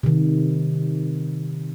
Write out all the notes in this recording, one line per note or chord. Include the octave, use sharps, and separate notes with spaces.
C3 D#3